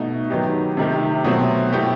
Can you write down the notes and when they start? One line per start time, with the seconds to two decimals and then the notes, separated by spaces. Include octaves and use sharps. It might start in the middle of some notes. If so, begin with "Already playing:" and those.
Already playing: B2 A3 D#4
0.30 D#3 F#3 B3 D#4 G4
0.77 C3 D#3 A3 D#4 G4
1.24 B2 F#3 A3 C4
1.72 B2 A3 E4 G4